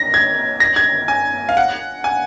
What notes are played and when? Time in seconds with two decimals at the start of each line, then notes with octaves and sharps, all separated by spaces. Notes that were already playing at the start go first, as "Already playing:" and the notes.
Already playing: A#6
0.14 G#6
0.60 A#6
0.76 G#6
1.08 G#5
1.49 F5
1.57 F#5
2.04 G#5